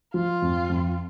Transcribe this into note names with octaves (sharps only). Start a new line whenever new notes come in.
F3 F4
F2
F2